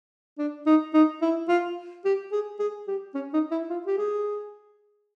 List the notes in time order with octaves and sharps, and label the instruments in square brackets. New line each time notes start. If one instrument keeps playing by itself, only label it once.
[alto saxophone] D4
D#4
D#4
E4
F4
G4
G#4
G#4
G4
C#4
D#4
E4
F4
G4
G#4